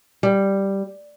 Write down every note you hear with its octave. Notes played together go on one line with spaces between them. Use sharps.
G3